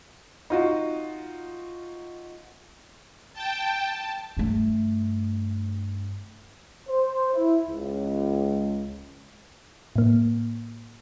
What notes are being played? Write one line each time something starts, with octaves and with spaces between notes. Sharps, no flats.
D#4 F4 F#4
G5 A5
G2 A3
C5
E4
C#2
A2 A#3